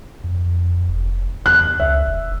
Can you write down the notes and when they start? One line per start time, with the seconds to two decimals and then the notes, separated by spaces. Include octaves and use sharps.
0.24 F2
0.88 F1
1.46 E2 F#6
1.80 C#2 E5
2.06 E1